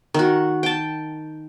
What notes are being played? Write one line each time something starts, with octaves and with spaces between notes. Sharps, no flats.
D#3 F#4
G5 A5